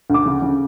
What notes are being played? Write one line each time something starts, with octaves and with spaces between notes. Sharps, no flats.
D2 D6
C#3
C#3